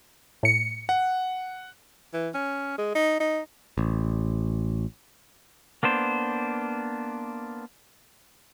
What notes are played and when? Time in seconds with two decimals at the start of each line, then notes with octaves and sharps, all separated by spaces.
0.43 A2 C#7
0.89 F#5
2.13 E3
2.34 C#4
2.78 G#3
2.95 D#4
3.20 D#4
3.78 A1
5.83 A#3 B3 D4 C5